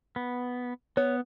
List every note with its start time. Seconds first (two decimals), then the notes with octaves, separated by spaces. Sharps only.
0.16 B3
0.97 B3 C#5